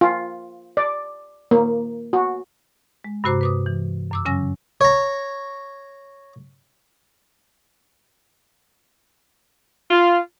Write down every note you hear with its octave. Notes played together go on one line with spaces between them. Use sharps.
F4
D5
A#3
F#4
G#3
G2 C3 F#4 C5 A#5 D6
B4 D6 D#6
E3
F#2 D6 E6
C#3 F#3 C#4 G#5 E6 A#6
C#5 A#5
F4